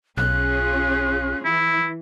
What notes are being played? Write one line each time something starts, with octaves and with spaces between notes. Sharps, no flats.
B1 C#4 F4 G#4 F#6
E3 E4